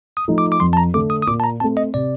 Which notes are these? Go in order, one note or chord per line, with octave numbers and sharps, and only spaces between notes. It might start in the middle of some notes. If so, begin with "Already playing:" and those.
D#6
F3 A3 D#4
D6
D6
F2 C6
A5
A#5
D3 A3 D6
D#6
D#6
A#2 D6
A5
A#5
A3 C4 A5
D#5
C3 D5